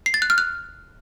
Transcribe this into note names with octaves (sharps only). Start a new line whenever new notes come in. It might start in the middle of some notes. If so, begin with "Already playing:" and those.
C7
A6
F#6
F6
F#6